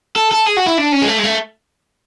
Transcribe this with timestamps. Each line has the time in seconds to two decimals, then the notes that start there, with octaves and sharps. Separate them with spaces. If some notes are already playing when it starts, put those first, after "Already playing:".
0.16 A4
0.31 A4
0.46 G#4
0.57 F#4
0.66 E4
0.78 D4
0.92 C#4
1.02 G#3
1.07 A3
1.19 G#3
1.24 A3